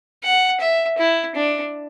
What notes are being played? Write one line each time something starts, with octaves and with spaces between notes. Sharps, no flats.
F#5
E5
E4
D4